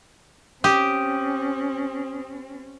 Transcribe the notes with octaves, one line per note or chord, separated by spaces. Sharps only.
C4 C#4 G4 D#6